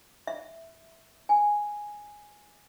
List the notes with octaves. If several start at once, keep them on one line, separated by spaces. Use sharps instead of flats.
E5
G#5